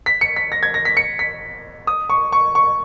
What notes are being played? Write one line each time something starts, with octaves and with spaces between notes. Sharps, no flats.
B6
C#7
B6
A#6
G#6
A#6
B6
C#7
B6
D#6
C#6
C#6
C#6